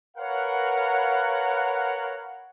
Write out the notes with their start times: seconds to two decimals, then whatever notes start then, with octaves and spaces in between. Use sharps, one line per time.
0.17 A#4 B4 C#5 F5 F#5